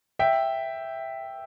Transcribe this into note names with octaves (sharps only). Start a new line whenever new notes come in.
E5 G5